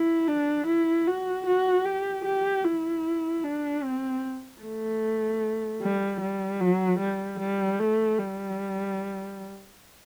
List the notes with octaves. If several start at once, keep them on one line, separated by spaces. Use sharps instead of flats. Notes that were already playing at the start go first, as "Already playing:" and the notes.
Already playing: E4
D4
E4
F#4
F#4
G4
G4
E4
D4
C4
A3
G3
G3
F#3
G3
G3
A3
G3